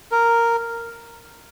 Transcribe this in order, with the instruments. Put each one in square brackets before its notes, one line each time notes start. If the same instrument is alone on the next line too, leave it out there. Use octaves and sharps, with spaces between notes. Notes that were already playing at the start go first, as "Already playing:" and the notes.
[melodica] A#4